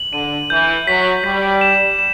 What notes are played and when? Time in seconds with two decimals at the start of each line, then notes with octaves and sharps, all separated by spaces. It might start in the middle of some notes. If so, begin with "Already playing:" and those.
Already playing: F#7
0.13 D3 D#7
0.50 E3 G6
0.87 F#3 B6
1.24 G3 B6
1.61 E7
1.99 E7